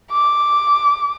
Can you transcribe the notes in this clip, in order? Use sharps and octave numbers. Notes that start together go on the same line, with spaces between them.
D6